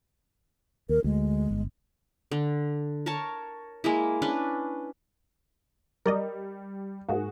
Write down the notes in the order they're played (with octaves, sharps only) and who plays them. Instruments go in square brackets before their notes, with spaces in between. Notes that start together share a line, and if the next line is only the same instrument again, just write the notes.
[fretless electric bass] D#2 [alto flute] A#4
[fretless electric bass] D2 [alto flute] G#3
[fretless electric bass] G1
[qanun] D3
A#4 C#5 A5
G#3 A#3 E4
C#4 D4 B4
[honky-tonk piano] G3 [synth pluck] A#4 D5 D#5
[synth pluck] G#2 A#3 [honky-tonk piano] F#4 G#4